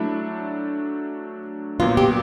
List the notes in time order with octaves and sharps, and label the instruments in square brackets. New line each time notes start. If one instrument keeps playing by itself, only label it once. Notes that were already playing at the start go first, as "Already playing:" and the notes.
Already playing: [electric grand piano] F#3 A3 D4 [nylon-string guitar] E4
[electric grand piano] A#2 F#3 B3 [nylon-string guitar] F4
[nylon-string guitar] G4